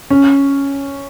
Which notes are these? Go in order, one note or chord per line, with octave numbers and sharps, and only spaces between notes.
C#4